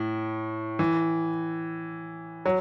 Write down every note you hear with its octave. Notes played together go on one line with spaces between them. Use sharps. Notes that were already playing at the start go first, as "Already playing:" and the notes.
Already playing: A2
E3
F#3